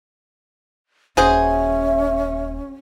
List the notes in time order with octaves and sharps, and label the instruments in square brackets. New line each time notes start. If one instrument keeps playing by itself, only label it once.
[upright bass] D#1 [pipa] F#3 G#4 C5 [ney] C#4 [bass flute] E5